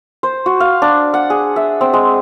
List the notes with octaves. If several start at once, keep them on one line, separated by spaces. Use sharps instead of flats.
C5
F#4
F5
D4
F#5
G#4
E5
C4
G#3